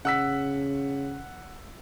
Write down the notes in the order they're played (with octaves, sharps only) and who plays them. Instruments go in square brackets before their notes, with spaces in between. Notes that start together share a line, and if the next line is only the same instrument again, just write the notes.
[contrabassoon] C#3 [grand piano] F#5 E6 B6